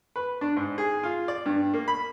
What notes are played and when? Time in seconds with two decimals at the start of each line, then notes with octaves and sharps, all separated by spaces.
0.16 B4
0.41 D4
0.57 G#2
0.78 G#4
1.03 F4
1.28 D5
1.46 G2
1.74 A#3
1.88 B5